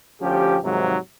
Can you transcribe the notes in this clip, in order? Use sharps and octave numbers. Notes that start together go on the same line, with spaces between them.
D2 F3 C#4 G4
G#2 C3 D#3 F3 F#3 G#3